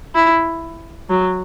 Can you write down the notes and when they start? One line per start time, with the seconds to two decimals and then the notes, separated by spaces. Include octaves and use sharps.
0.15 E4
1.10 F#3